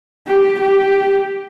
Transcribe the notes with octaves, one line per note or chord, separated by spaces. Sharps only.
G4
G4